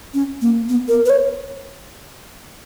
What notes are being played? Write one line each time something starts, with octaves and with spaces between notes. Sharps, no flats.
C#4
A#3
B3
A#4
B4
C#5